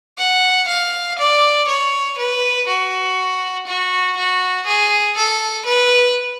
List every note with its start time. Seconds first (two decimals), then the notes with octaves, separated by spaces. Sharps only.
0.18 F#5
0.68 F5
1.19 D5
1.68 C#5
2.18 B4
2.68 F#4
3.67 F#4
4.17 F#4
4.67 G#4
5.17 A4
5.66 B4